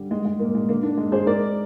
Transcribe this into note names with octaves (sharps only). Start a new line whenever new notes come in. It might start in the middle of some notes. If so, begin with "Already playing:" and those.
Already playing: D3 G3
G#3
G#3
A#2 A#3
G#3
D3 A#3
A#3 D4
G#3
G#4 C5
G#3 A#4 D5